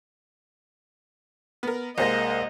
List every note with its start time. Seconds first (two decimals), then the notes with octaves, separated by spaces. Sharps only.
1.63 B3 A#4
1.98 C2 G#3 A#3 C5 D#5 A#6